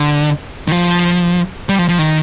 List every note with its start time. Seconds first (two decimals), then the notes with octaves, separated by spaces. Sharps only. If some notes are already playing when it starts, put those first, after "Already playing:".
Already playing: D3
0.68 D#3
0.72 F3
1.69 G3
1.79 F3
1.89 F3
1.99 D#3